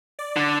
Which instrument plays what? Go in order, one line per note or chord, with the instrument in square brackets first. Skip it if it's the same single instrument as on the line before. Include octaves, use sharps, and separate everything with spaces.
[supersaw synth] D5
[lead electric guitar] D3